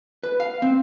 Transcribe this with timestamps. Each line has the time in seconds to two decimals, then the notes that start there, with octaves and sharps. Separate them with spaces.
0.23 B4
0.40 F5
0.62 C4